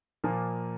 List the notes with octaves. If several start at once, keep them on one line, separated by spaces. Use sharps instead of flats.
A#2 F3 A#3